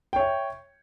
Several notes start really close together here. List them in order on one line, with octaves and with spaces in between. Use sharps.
G5 C#5 E5